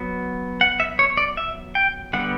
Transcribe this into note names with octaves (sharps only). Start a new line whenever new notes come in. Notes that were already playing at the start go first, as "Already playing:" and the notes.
Already playing: F#3 B3
F#5
E5
C#5
D5
E5
G5
D3 G3 B3 F#5